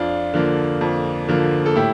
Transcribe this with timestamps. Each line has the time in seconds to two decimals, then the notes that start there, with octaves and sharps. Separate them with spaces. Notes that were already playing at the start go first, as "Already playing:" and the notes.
Already playing: F2 D4 F4
0.34 D3 F3 A#3
0.81 F2
1.29 D3 F3 A#3
1.66 A4
1.76 A2 E4 G4